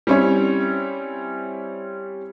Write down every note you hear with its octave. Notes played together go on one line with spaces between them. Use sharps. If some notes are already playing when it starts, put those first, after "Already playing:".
G3 C4 C#4 E4 C#5